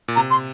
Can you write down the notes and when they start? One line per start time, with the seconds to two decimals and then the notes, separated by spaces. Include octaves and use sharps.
0.08 A#2
0.16 C3 A#5
0.31 C6